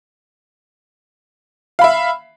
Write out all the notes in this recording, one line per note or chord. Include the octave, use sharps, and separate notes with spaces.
E5 F5 B5